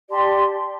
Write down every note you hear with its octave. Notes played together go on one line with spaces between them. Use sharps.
G4 D5 A5 C6